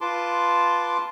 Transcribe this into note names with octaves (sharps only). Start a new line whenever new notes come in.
F4 B4 A5 C6 D6